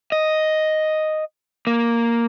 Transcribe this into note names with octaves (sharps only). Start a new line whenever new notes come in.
D#5
A#3